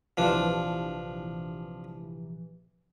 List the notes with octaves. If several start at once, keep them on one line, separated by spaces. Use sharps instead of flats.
A#1 C3 E3 F3 D4